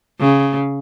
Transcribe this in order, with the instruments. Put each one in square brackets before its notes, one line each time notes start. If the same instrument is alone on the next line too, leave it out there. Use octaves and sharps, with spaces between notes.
[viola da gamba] C#3